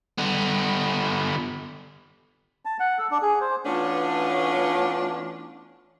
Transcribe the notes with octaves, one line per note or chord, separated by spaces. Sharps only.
D3 B3
A5
F#5
A4
D4
G#4
C5
E3 A3 B3 C#4 D4 F4